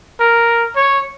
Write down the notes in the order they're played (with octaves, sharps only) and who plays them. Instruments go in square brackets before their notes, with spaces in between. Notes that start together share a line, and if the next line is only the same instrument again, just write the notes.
[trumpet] A#4
C#5